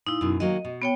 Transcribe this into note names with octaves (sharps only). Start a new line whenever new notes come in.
A#2 D#4 E4
F#2 B2
D#3 F#3 A#3 D#5
B2
B3 C#5 G5